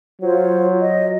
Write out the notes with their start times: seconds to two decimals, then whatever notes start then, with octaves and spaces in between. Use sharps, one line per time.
0.22 F#3 F4 C5 C#5
0.81 D#5